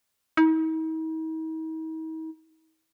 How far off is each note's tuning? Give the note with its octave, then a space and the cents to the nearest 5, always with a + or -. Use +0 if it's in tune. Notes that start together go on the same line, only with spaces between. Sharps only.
D#4 +45